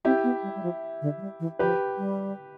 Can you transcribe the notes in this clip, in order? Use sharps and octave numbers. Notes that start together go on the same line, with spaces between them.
C4 E4 G4
B3
G3
G3
F3
D3
F3
G3
E3
F3 G4 B4
G3